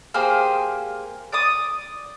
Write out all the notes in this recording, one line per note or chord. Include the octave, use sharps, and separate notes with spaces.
A#3 G4 G#4 C5
D5 D6 D#6